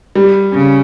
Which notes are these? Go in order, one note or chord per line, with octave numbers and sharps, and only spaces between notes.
G3
C#3